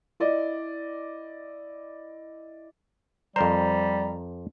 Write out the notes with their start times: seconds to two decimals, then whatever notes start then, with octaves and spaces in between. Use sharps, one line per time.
0.20 E4 D5 D#5
3.36 F2 G3 A#4 C5 A#5